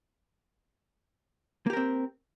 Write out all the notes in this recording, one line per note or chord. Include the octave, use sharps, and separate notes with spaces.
A#3 C4 G4 A#4